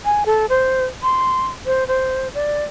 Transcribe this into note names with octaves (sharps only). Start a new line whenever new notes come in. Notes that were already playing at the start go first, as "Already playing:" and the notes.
G#5
A4
C5
C6
C5
C5
D5